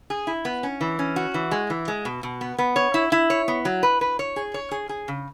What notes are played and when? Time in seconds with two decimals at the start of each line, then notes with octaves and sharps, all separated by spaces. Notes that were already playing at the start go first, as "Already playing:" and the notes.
0.10 G#4
0.27 E4
0.45 B3
0.63 C#4
0.81 E3
0.99 C#4
1.16 F#4
1.34 E3
1.51 G#3
1.70 E3
1.88 G#3
2.05 B2
2.23 B2
2.41 B3
2.58 B3
2.76 C#5
2.94 E4
3.12 E4
3.30 C#5
3.48 B3
3.65 F#3
3.83 B4
4.01 B4
4.19 C#5
4.36 G#4
4.54 C#5
4.71 G#4
4.89 G#4
5.08 C#3